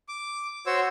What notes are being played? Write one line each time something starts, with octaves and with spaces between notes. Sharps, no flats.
D6
F#4 C5 C#5 E6